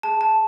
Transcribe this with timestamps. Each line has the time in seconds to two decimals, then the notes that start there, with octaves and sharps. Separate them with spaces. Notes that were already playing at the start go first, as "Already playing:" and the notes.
0.03 G#4 A5
0.21 A5